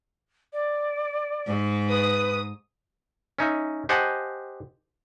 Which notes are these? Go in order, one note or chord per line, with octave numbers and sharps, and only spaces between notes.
D5
G#2
B4 D#6
C#4 D#4 E5
G4 C5 D#5 F#5 G#5 A5